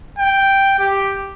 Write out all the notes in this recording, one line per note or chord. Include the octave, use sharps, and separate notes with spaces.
G5
G4